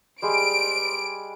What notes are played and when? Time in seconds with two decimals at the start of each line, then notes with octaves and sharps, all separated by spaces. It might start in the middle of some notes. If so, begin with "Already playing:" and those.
0.22 G3 G#3 G#4 D7